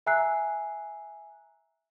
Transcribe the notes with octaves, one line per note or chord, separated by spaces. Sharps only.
E5 G#5 A#5 E6 F#6 C7